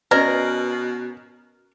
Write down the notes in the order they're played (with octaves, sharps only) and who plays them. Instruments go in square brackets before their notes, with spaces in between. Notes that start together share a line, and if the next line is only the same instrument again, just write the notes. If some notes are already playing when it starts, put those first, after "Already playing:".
[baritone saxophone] B2 [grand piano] C#4 [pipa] A#4 [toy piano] B4 D5 D#5